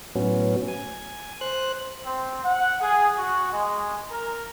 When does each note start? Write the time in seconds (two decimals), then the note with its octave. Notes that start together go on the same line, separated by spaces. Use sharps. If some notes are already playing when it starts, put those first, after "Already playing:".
0.15 A2 F#3 B3 C#4
0.68 G#5
1.41 C5 F#6
2.05 C4
2.44 F#5
2.81 G#4
3.18 F#4
3.52 G#3
4.10 A#4